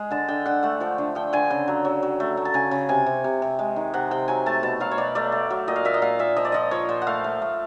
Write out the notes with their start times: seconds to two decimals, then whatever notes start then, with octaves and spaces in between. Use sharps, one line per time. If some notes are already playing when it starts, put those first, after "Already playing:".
Already playing: G#3
0.11 D3 A5
0.28 D3 G5
0.46 D3 F#5
0.63 A3 F#5
0.80 F3 G5
0.98 D3
1.15 F3 G5
1.33 D3 G#5
1.50 C#3 G5
1.68 F#3
1.85 F#3
2.03 F#3
2.20 A3
2.37 A3
2.45 A5
2.54 C#3 G#5
2.71 C#3
2.89 C3 G#5
3.06 C3
3.24 C3
3.42 C3
3.59 G#3
3.76 D#3
3.94 C3 F#5
4.11 C3 G5
4.28 F#3 G#5
4.46 A3 A5
4.63 B2 A5
4.80 F#3 F5
4.91 C#5
4.98 B2 D5
5.15 A3 D5
5.32 A3
5.50 F#3
5.68 A#2 D#5
5.76 F5
5.85 A#2 E5
5.94 D#5
6.02 A#2 F5
6.19 A#2 E5
6.36 F3 D#5
6.45 D5
6.52 F3 D#5
6.71 F3 C#5
6.89 A#2 C5
7.02 F#5
7.07 A3 F5
7.24 A3
7.42 A3